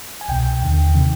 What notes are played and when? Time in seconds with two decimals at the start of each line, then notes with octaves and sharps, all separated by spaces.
0.21 G#5
0.28 C2 B2 G5
0.62 D#2 D3
0.94 C3 D#3